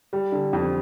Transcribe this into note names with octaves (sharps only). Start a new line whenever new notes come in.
G3
D3
F2